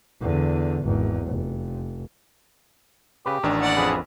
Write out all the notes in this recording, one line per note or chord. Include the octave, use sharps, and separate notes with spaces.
E2 D3
G#1 E2
F1
C#3 G4 B4
A1 D#3 D4
A#3 D5 F#5
F2 G#4 B4